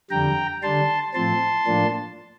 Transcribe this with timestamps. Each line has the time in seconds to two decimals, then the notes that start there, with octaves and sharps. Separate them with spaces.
0.11 F2 D3 G3 G5 A#5
0.63 D3 G3 D4 A5 C6
1.14 A2 F3 C4 A5 C6
1.66 A2 F3 A#3 D4